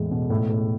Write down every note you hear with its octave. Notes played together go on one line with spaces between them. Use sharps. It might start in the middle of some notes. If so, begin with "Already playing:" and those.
Already playing: E2 A2 G#3
B2
A2
A2